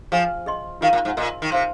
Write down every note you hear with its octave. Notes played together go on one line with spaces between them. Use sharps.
F3 G#4 F5 G#5
G#4 D#5 C6
D#3 F4 G#4 F5 A#5
A#2
G#2
A#2 A#4 D#5 C6
D#3
C3 C5 F5 C6